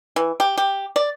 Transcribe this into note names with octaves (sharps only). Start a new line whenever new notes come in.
E3
G4
G4
D5